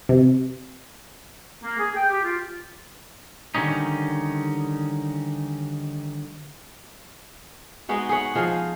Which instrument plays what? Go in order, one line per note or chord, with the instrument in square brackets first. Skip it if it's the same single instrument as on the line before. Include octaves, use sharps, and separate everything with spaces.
[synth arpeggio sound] C3
[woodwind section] A#3
G#4
G5
G4
F4
[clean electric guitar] D3 D#3 G3 C#4 D#4
[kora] G#3 B3 D#4 F#4
G#4 B4 C#5 F#5
F3 F4 G#4 D#5